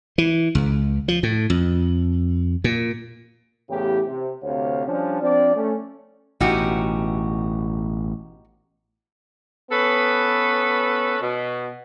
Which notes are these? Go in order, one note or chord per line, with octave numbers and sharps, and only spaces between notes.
E3
C#2
F3
A2
F2
A#2
E2 A2 C#3 G4
C3
D2 C3 C#5 F5
F3 G3 C#4 D4
F3 C4 D4 D5
A3 C#4
A1 B2 D#4 F#4 G4
B3 C#4 A4 B4
B2